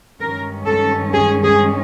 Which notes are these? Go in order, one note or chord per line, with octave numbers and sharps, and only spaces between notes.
G2 D#3 G#3 C#4 A#4
A4
G#4
G#4